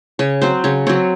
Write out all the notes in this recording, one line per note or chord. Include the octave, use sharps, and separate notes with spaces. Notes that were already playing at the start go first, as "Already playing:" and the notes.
C#3 C#5
F#3 C4 C5
C#3 C#5
F#3 C4 C#5